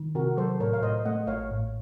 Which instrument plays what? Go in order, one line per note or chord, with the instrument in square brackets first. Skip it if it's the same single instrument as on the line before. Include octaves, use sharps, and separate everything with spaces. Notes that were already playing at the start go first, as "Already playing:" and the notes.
Already playing: [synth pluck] D#3
[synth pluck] C3 [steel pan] F#4 A#4
[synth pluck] F#3 [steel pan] A4 C5
[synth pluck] A2 [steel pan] A#4 C#5
[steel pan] F5
[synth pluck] A2 [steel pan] C5 D#5
[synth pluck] A3 [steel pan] D#5 F#5
[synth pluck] A1 [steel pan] C#5 F5
[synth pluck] A2